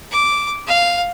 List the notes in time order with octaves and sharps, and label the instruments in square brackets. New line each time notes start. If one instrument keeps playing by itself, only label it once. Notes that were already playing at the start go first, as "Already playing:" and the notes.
[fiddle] D6
F5